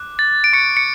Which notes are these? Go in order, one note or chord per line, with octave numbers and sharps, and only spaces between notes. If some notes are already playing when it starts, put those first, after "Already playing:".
Already playing: D6 F#6
A6
D7
C#6 F#6 C#7
C#7